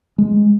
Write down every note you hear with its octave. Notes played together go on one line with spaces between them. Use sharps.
G#3